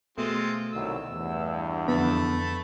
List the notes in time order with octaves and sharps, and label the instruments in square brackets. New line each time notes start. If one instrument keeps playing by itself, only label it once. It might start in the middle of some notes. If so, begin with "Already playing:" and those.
[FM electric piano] B2 A3 [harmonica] G#3 C4 F4
[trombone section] C2 D#3 F#3 [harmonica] E6
[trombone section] E2 G2
[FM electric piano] F2 D3 [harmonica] A3 A5 B5 [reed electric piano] B3